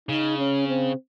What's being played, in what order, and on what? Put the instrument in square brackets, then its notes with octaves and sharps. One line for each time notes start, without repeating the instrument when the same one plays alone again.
[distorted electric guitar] C#3 [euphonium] D#4
[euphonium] C#4
C4